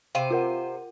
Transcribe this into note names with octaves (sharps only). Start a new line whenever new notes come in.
C3 C5 F5 G5 D#7
F4 A#4 F#5